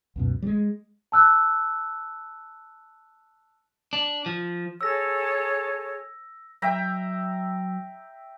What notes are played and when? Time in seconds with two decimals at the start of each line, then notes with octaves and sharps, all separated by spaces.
0.16 C#2 F#2 B2
0.42 G3 G#3
1.12 A5 E6 F#6
3.93 D4
4.26 F3
4.81 G#4 A4 C#5 E6 A#6
6.62 F#3 E5 G5 A#5